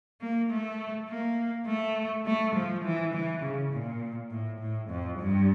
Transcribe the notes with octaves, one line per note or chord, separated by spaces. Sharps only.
A#3
A3
A#3
A3
A3
F3
E3
E3
C#3
A#2
A2
A2
F2
G2